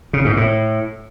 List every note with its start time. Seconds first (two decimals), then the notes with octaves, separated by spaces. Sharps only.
0.13 C#3
0.25 G#2
0.37 A2